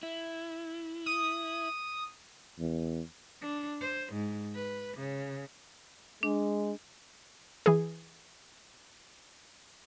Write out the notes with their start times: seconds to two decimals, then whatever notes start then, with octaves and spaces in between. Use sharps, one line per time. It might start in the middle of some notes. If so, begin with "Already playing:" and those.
0.03 E4
1.06 D#6
2.59 E2
3.42 D4
3.81 C5
4.13 G#2
4.55 B4
4.97 C#3
6.23 G#3 D4
7.66 E3 G#4